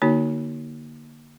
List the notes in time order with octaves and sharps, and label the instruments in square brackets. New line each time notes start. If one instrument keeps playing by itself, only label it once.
[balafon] D3 A#3 D#4 F#4 C#5